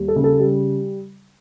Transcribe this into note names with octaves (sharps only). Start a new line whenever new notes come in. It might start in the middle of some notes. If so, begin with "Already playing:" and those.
Already playing: D#2 G3
A4
C#3
A4
G3